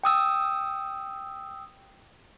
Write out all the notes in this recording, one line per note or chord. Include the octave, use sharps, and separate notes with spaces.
G5 D#6 E6